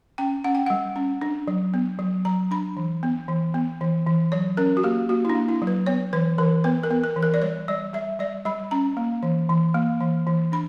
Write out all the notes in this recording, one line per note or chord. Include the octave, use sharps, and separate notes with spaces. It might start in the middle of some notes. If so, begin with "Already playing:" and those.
C#4 G5
C#4 F#5
G5
G3 F#5
C#4
D4
F#3
B3
F#3
F#3 A#5
D4 B5
E3
B3
E3
B3
E3
E3
F#3 C#5
C#4 A#4
F#4
A#3 G4
A#3 F#4
E4
D4
A#3
E4
F#3
B4
B3 C#5
E3 B4
E3 A#4
B3 B4
A#4
B3
A#4
E3
A#4
D5
G3 C#5
G3 D5
G3 E5
G3 D5
G3 B5
C#4 A#5
A#3
E3
E3
A#3
E3
E3
D4 B5